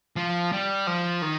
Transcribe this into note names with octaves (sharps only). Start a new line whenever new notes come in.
F3
G3
F3
D#3